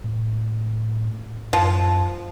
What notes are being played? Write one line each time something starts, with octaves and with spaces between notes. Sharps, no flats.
A2
F#2 F3